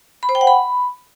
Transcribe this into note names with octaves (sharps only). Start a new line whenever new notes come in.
B5
C5
G5
F#5
B5